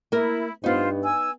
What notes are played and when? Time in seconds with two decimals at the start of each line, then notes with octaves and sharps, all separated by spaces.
0.12 A#3 E4 A#4
0.64 G2 B3 D#4 F4 C5
1.03 G#5 E6